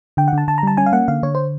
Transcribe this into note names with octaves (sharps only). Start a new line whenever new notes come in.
D3 G5
F#5
D3 A5
D3 A5
A#5
G3 A5
C#4 G#5
F5
A#3 F#5
D3 F5
D3 C#5
C5